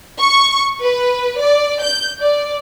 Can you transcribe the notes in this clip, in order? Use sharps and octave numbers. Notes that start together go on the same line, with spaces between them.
C#6
B4
D5
G6
D5